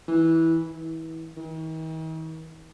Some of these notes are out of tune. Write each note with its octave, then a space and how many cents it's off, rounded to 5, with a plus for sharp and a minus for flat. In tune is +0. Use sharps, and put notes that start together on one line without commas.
E3 -15
E3 -30
D#3 +45